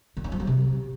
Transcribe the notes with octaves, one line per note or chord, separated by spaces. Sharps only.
D#3
C#4
F3
F#3
C3